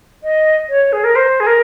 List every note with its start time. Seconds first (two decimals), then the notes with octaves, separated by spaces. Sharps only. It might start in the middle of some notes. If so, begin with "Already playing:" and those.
0.24 D#5
0.69 C#5
0.93 G#4
1.04 A#4
1.16 C5
1.40 G#4
1.47 A#4